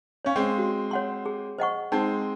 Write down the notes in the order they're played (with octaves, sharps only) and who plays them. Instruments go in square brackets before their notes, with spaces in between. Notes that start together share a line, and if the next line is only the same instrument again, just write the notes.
[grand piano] C#4 [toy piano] C#5 F5
[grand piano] G#3 C4
[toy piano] F#4
C#5 F#5 C6
G#4
C5 D#5 F#5 C#6
[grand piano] G#3 C4 [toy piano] D#4